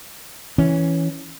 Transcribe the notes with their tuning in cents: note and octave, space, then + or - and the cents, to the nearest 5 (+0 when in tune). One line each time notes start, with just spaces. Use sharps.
E3 +0 C#4 +0